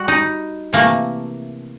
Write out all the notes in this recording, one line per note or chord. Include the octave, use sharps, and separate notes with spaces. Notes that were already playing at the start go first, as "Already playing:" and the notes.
Already playing: G3 F#4
D#4
C3 E3 A3 A#3